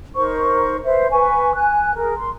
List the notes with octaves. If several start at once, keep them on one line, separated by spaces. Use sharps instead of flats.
D#4 A#4 C5 C#6
B4 C5 E5
B4 G#5 C#6
G#5 F#6
G#4 A#4
C6